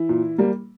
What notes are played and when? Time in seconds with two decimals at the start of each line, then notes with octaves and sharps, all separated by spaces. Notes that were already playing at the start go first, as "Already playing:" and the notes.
Already playing: E3 E4
0.09 A#2
0.38 G3 A#3